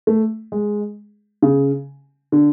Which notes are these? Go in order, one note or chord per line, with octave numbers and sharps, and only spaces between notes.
A3
G#3
C#3
D3